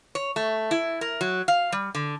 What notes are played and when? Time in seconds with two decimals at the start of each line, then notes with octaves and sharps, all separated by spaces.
0.15 C#5
0.36 A3
0.71 E4
1.01 A#4
1.21 F#3
1.48 F5
1.72 G3
1.95 D3